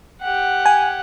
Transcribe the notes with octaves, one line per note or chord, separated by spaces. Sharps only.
G4 F#5
G#5